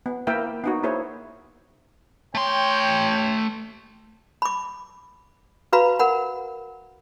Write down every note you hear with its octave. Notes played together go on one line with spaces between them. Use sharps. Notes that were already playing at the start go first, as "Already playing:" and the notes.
B3
A#3 E4 A#4 E5 G5
B3 D#4 F#4
A#3 E4 G#4 C5 C#5
A3 C#5 G5 C6
B5 D6
F#4 B4 F5 A#5 B5
A#4 F#5 B5